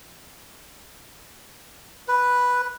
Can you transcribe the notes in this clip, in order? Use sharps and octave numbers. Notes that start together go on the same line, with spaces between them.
B4